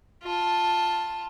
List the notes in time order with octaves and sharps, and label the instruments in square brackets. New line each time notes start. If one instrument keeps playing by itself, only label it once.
[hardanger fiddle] F4 A5